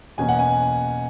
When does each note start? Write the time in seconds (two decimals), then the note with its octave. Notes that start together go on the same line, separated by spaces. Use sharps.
0.18 E2 B2 A#3 C#4 G#5
0.29 F#5
0.39 G#5